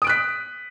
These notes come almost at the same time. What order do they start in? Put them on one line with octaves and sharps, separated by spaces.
D#6 D7 F#6 B6